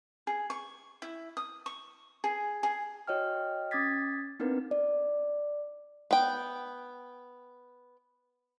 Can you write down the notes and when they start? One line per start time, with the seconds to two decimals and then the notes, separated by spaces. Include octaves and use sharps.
0.27 G#4
0.50 C#6
1.02 E4
1.37 D#6
1.66 C#6
2.24 G#4
2.63 G#4
3.07 F#4 C#5 D#5 G5 F6
3.71 C#4 D6 D#6 G#6 A6 B6
4.40 B3 C4 D4 D#4 A#4 B4
4.71 D5
6.11 B3 G5